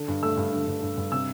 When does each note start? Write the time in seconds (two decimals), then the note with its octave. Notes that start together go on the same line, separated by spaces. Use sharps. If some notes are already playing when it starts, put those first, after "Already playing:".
Already playing: D3
0.08 G2
0.23 A3 E6
0.37 G2
0.52 D3
0.67 G2
0.82 G2
0.97 G2
1.12 C3 E6